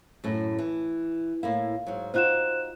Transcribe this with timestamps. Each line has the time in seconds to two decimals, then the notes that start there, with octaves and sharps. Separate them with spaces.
0.24 F#2 A2
0.59 E3
1.43 A2 A#3 E4 F5
1.86 G#2 F#3
2.14 D#4 F4 F#4 C5 F#6 E7